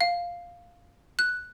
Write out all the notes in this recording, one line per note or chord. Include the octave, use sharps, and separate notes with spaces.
F5
F#6